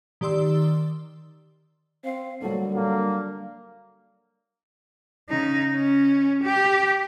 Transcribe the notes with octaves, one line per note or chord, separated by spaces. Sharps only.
D#3 G4 D5 C6 E6
C4 F5
D3 F#3 G3 A3 A#3
F#3 A#3 D4
C#3 D#4
C#4
G4